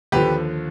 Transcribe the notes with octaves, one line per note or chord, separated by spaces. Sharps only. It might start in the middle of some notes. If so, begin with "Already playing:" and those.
D#2 D3 F3 G4 B4